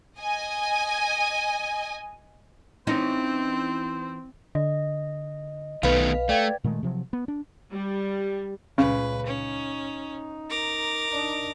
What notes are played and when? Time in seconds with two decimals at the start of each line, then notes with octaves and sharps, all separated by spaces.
0.19 D#5 G#5
2.87 E3 C4 C#4 D#4 C5
4.55 D3 D#5
5.83 B1 D#3 A3 B3 B4 F5
6.29 A3 D5 G5 G#6
6.64 A#2 D#3 G#3 A3
6.83 C3 F3 F#3
7.13 B3
7.28 D4
7.72 G3
8.78 C#2 A#2 C#3 B4
9.27 C#4 D#4
10.50 A#4 D6
11.10 D4 D#4